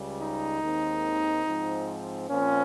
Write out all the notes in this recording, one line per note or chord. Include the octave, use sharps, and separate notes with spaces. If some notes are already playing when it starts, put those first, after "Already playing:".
Already playing: C#2 C#3 G3
D#4
D#2 D#3 G#3 C4
G#2 F3 C4
A#2 F3 C4 C#4